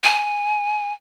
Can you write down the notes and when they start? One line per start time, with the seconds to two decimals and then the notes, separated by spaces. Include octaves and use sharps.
0.04 G#5